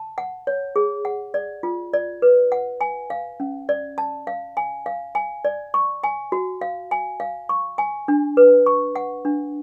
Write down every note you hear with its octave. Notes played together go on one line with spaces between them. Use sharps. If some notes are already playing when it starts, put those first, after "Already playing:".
Already playing: A5
F#5
C#5
G#4
F#5
D5
F4
D5
B4
F#5
G#5
F5
C#4
D5
A5
F5
G#5
F5
G#5
D5
C#6
G#5
F#4
F5
G#5
F5
C#6
G#5
D4
B4
C#6
F#5
D4